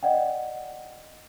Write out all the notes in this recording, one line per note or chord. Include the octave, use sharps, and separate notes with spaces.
D5 D#5 F#5 G5